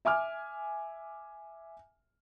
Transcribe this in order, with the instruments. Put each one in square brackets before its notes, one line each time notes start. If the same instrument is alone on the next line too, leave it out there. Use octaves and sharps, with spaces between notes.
[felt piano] E5 G#5 D6 F6